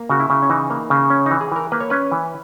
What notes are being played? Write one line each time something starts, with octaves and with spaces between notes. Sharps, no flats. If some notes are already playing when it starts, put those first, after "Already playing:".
Already playing: A#3
C#3 F#4
E4
C#3
C#4
E3 D#4
A#3
C#3
C#4
E3 D#4
G#4
E3 A#4
A#3 B4
C#5
C#4 B4
E3